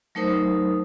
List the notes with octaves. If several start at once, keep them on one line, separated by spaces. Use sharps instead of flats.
F#3 A3 D#4 A#4 C5 D#6